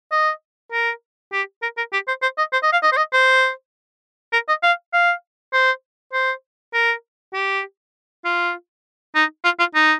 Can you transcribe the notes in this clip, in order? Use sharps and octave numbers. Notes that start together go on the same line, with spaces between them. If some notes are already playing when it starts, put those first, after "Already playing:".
D#5
A#4
G4
A#4
A#4
G4
C5
C5
D#5
C5
D#5
F5
D#5
C5
D#5
C5
A#4
D#5
F5
F5
C5
C5
A#4
G4
F4
D#4
F4
F4
D#4